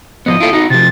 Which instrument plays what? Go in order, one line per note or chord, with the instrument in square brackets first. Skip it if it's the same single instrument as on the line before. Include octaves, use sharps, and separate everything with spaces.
[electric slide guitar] F3 F#3 B3 [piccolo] D#5
[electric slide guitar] E4 F4 A4
D#4 F#4
[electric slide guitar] C3 F3 [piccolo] A6